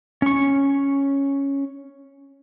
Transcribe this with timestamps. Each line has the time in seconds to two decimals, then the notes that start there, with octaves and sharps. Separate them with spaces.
0.22 C#4 C#6